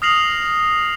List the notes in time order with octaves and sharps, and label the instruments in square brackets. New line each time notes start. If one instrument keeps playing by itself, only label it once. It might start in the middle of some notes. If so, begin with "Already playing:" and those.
[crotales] D#6 F6 A#6 C7 F7 F#7